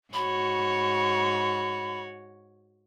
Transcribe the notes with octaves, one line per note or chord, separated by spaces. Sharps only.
G#2 F#4 C#5 B5